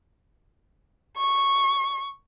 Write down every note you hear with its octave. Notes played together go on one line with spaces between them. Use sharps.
C#6